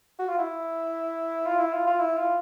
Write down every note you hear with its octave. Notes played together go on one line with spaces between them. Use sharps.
F#4
F4
E4
F4
E4
F4
F4
E4
F4